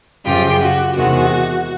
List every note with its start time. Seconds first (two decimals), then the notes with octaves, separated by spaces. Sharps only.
0.25 F#2 C#3 F3 F4 G4
0.60 F#4
0.95 E2 C3 D#3 G#3 F#4